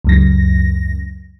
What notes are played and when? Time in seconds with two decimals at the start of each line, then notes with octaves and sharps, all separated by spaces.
0.04 C#2 F#2 A#6